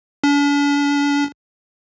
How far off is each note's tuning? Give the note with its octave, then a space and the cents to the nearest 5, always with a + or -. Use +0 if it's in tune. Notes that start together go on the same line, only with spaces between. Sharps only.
D4 -45